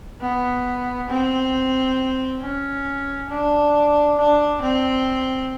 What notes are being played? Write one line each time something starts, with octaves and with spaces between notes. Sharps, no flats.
B3
C4
C#4
D4
D4
C4